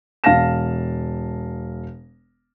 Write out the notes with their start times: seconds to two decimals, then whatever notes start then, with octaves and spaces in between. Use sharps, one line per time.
0.24 E1 F5 A5 A#6 E7